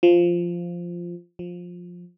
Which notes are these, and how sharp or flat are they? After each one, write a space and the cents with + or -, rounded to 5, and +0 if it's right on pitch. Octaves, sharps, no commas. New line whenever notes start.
F3 -5
F3 +15